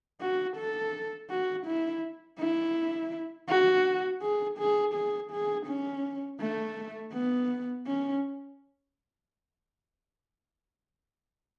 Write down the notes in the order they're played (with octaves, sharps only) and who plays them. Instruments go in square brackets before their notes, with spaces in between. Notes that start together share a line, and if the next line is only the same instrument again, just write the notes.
[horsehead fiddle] F#4
A4
F#4
E4
E4
F#4
G#4
G#4
G#4
G#4
C#4
A3
B3
C#4